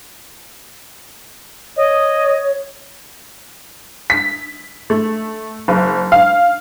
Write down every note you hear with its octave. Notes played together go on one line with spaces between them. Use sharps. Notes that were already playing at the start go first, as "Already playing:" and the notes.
C#5 D#5
B6
A3
F#1
F5